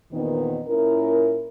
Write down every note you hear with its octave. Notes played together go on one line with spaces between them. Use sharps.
E2 A#2 D#3 B3 C4 D#4
A#2 C#4 E4 A#4